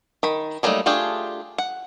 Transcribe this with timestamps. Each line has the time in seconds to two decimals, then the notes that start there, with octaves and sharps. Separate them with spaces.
0.23 D#3 B5
0.63 F#3 G3 A3 A#3 D#4
0.86 A3 D4 F4 G4 G#4
1.58 F#5